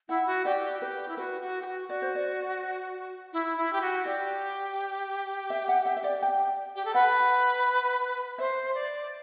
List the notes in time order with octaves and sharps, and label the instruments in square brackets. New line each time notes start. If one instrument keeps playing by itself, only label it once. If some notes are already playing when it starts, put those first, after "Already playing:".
[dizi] E4 [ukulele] F#5
[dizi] F#4
[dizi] G4 [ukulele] D5
[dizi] G4 [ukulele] B4
[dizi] E4
[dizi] F#4 [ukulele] B4
[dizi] F#4
G4
F#4
[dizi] F#4 [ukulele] D5
[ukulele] C5
D5
[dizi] E4
E4
G4
F#4
[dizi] G4 [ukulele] D5
[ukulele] E5
F#5
E5
E5
D5
G5
[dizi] G4
A4
[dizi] B4 [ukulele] F#5
[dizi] C5 [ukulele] E5
[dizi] D5